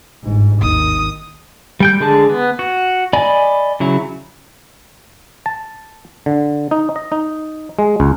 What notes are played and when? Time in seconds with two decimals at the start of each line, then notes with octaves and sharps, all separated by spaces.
0.24 G1 G#2
0.62 G#1 D#2 D#3 D#6
1.80 G3 G5 G6
2.00 D3 G#3 G#4 A5
2.29 B3
2.59 F#4
3.13 D5 D#5 G#5 B5
3.80 C#3 F#3 E4
5.46 A5
6.26 D3
6.71 D#4
6.96 D#5
7.12 D#4
7.79 G#3
8.00 C#2